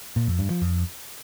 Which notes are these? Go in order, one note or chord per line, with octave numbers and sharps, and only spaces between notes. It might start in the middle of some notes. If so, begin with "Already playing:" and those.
A#2
F2
G2
F3
F2